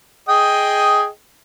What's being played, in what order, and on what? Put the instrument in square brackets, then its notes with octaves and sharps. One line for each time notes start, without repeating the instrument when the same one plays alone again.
[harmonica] G#4 D#5 G5